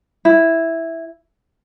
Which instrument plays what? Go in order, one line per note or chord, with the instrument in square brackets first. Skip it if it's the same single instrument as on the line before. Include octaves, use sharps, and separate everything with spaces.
[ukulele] E4